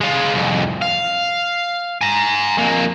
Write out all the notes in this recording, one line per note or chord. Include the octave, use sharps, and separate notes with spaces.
G#3 F4
C2 F2
F5
G#5 A#5
F2 A#3